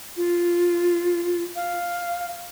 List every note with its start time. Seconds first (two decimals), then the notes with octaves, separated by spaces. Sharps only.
0.17 F4
1.56 F5